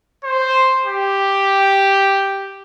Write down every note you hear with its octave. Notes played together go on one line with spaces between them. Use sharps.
C5
G4